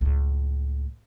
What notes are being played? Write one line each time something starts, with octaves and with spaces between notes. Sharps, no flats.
C#2 A2